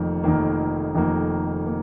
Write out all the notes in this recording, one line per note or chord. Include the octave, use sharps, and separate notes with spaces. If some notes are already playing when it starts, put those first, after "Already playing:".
Already playing: F1 F2 D#3 A#3
F1 F2 D#3 A#3
F1 F2 D#3 A#3
A#3